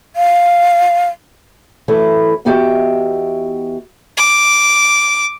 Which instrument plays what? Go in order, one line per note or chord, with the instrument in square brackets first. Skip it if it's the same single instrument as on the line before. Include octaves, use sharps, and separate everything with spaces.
[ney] F5
[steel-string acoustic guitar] F#2 E3 A3 E4
E2 B3 F#4 G4 D#5 E5
[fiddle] D6